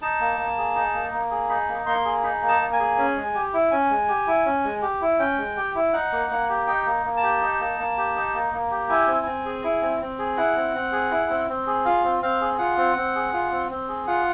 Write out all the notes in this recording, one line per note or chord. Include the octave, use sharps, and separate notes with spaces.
D#4 A5
A#3
A#3
G#4
D#4
A#3
A#3
G#4
D#4 B5
A#3
A#3 C6
G#4
D#4 B5
A#3
A5
A#3
G#5
G#4
C#4
G#3
G4
E4
C#4 G#5
G#3
G4
E4
C#4
G#3
G4
E4
C#4 G5
G#3
G4
E4
D#4 F#5
A#3
A#3
G4
D#4 G5
A#3
A#3
A5
G4
D#4
A#3
A#3
G4
D#4
A#3
A#3
G4
E4 G#5
C4
C4
G#4
E4
C4
C4
G#4
E4 F#5
C4
C4
G#4
E4
C4
C4
G#4
F4 F5
C4
C4 F5
G#4
F4 F#5
C4
C4
G#4
F4
C4
C4
G#4
F4 F#5